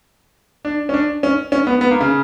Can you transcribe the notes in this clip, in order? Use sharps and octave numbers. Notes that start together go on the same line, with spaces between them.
D4
C#4
D4
C#4
C#4
B3
B3
A#3
C#3